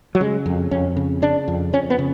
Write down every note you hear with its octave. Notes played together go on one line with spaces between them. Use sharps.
F#3
C#3 G#3
F2
F2 C#4
C#3
C#3 D4
F2
F2 C#4
B3
C#3